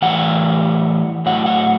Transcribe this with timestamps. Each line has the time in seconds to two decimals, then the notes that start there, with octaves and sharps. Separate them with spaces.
0.02 A2 E3 G3 F#5
1.26 A2 F#3 F#5
1.46 F#5